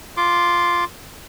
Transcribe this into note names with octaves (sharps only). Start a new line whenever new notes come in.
F4 C6 D6